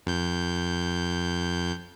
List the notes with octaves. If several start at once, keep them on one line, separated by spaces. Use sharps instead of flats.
F2 G6